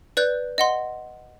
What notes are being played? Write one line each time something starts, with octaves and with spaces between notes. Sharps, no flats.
B4 D5 F#6 G6
D#5 F#5 C6